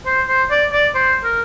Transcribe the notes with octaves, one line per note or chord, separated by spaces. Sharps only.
C5
C5
D5
D5
C5
A#4